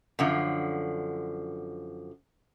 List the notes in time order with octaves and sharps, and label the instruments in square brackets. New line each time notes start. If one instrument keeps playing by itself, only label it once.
[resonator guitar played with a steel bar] F#2 D3 F3